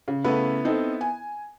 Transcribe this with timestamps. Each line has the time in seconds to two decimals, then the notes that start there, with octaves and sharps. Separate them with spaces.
0.08 C#3
0.24 C#3 A3 B3 E4 B4
0.65 C4 D#4 A4
1.01 G#5